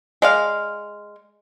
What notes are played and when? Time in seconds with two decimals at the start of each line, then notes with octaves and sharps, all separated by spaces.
0.22 G#3 D5 F5